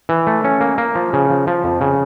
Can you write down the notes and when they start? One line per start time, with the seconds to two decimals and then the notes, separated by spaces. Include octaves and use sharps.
0.09 E3
0.27 A3
0.44 C#4
0.61 A#3
0.78 A#3
0.95 F3
1.13 C#3
1.30 F3
1.47 F3
1.64 F2
1.81 C#3